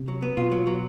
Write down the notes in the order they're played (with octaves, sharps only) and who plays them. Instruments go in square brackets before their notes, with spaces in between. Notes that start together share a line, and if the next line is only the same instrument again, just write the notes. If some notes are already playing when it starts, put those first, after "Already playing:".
Already playing: [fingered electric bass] C3
[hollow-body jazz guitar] F#3
B3
[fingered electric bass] B2 [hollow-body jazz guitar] F4
[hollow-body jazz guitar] F#3
F#3